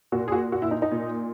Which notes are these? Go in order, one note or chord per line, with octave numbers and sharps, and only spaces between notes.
A#2 F#4
G#4
F#4
F#4
E4
D#4
D#4
A#2